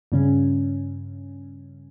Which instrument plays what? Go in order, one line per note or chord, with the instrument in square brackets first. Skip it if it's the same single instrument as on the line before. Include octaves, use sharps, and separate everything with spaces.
[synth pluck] G2 C#3 C#4